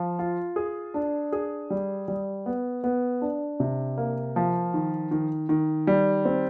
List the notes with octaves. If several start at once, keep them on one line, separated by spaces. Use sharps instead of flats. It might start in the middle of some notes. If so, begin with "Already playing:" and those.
Already playing: F3
F4
G#4
D4
G#4
G3
G3
B3
B3
D4
C3
A#3
F3
D#3
D#3
D#3
G3
C4